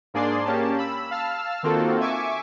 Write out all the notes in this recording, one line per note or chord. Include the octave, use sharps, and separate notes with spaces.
G#2 A#3 D4 G#4 D5 C6
A#3 C#4 G4 A5
B5 E6
F5 A5 E6 F6
D#3 A#3 C4 F4 F#4 A4
E5 G#5 C#6 D6